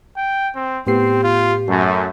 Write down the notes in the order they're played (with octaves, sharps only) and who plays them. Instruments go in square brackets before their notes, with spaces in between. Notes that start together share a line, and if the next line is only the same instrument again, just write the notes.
[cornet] G5
C4
[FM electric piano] A2 B3 C7 [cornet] C4 [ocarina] G4
[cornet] F4
[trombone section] F#2 [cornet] A3